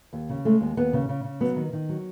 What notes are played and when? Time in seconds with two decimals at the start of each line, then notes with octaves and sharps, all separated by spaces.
0.13 D#2
0.29 C#3
0.45 G#3 A3
0.61 D#2
0.77 D#2 B3
0.93 C#3
1.09 C#3
1.24 C#3
1.40 F#3 B3
1.56 D#3
1.73 D#3
1.89 F#3